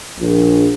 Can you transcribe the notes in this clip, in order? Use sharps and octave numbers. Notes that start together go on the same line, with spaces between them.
A#1